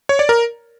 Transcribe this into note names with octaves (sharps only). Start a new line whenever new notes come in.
C#5
D5
A#4